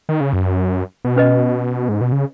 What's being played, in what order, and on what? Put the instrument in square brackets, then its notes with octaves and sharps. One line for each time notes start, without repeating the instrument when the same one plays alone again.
[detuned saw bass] D#3
C#3
F#2
B2
[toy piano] C#4 B4 D#5
[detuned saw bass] G#2
B2
C#3